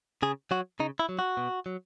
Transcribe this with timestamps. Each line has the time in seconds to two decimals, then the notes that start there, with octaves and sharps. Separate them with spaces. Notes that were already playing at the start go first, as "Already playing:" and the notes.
0.22 C#3 G#4
0.51 F#3 F#4
0.80 C#3 D#4
0.99 E4
1.09 F#3
1.19 F#4
1.37 B2
1.66 F#3